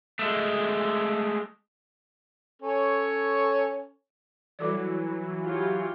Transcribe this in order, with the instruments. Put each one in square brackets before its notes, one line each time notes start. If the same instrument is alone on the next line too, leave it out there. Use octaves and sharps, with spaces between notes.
[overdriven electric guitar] G#3 A3
[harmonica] C#4 A4 C#5
[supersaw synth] E3 F#3 [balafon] G3 A4 D5
[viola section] F4 G4 C#5